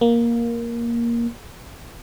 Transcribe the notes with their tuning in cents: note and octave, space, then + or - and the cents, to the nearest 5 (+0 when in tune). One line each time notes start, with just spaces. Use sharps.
A#3 +10